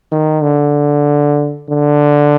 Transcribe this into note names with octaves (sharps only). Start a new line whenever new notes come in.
D#3
D3
D3